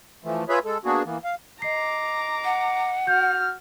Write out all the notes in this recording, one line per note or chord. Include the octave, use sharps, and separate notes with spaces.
E3 F3 A3
F4 G#4 B4 C#5 E5 B5
G#3 A4
A#3 B3 D4 F#4 G#4
E3 A#3 B3
F5
D#5 A#5 D6 C7
F#5
F#4 F6 G6